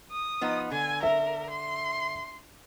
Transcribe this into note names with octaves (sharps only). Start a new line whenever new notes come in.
D#6
F3 B3 D#4
D3 G#5
A#4 E5
C6